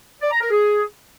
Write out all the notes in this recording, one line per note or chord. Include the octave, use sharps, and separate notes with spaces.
D5
A#5
A#4
G#4